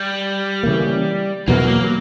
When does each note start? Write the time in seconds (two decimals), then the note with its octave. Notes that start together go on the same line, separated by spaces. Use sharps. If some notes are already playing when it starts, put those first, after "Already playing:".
Already playing: G3
0.63 C#3 E3 A#3
1.48 E2 B2 F#3 A#3 B3
1.68 A#3
1.84 F#3